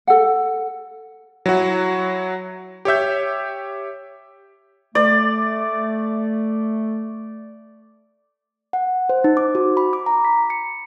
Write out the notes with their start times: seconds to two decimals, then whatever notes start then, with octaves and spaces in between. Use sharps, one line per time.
0.07 A4 F#5
1.46 F#3 E4 F#4
2.85 G4 C#5 E5 G6
4.95 A3 D5
8.73 F#5
9.09 C5
9.24 D#4
9.37 D6
9.55 F#4
9.77 B5
9.93 D6
10.06 A#5
10.25 B6
10.50 C#7